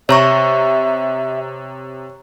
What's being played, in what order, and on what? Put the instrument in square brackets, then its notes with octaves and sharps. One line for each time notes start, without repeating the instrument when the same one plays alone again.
[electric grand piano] C3 [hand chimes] C#5 A#5 C#6 [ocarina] E5